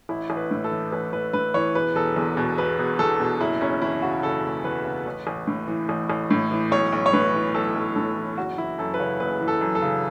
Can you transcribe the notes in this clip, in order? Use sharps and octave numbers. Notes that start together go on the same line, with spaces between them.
A1 E4
A1
B4
A2
A4
E3
A1 B4
A1 B4
A2 B4
E3 C#5
E1 B4
E1 A4
E2
B2
E1 B4
E1
E2 A4
B2
F#1 E4
F#1 C#4
E2 E4
C#3 F#4
F#1 A4
F#1
E2 B4
C#3
A1
A1
A2
E3
A1
A1
A2
E3
B1 C#5
B1
C#5
A2 B4
E3
B1 A4
B1
A2 A4
E3
F#1 F#4
E3 E4
F#2 A4
B4
C#3 C#5
F#1 B4
E3
A4
F#2
A4
C#3